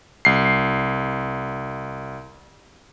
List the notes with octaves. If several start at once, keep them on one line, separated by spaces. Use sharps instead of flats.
C2 C7